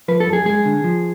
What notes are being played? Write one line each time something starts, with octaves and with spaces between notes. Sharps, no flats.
F3 B4
A4
F#2
G#4
G#3 G#4
D3
F3